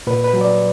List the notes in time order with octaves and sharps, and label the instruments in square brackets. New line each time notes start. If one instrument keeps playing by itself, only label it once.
[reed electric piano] A#2 B4
B4
F#3
D5